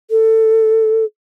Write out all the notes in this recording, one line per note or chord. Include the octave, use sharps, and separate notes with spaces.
A4